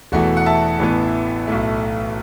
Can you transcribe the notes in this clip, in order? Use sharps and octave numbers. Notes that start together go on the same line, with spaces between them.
E1 E2 E3 A3 F#4
F#5
E5 A5
A1 A2 E3 B3
B1 A2 A3